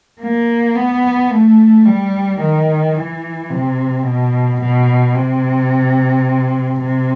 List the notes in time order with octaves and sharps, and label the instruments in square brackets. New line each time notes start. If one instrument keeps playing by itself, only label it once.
[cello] A#3
B3
A3
G3
D#3
E3
C3
B2
B2
C3
C3